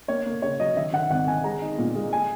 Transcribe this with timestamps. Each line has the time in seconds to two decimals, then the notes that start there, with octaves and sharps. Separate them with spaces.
0.08 A#3 C#5
0.26 A#3
0.42 C#3 C#5
0.59 F#3 D#5
0.76 D#3 E5
0.93 D#3 F#5
1.10 G#1 F#5
1.27 D#3 G#5
1.44 G#3 A#5
1.61 D#4
1.78 A#2
1.95 G#3
2.13 G#5